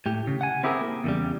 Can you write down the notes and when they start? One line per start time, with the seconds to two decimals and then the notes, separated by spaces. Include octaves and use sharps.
0.06 A2 G4
0.27 C#3
0.41 F#5 G#5
0.63 C4 E4 G4 G#4 A#4
0.81 A#3
1.04 E2 C#3 G3